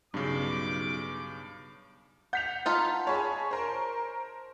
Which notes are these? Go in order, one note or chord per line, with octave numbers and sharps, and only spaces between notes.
B1 G2 C#3 D6
F#5 G6 B6 F7
D#4 F4 A4
G#4 C#5 A5 B5
A#4 C5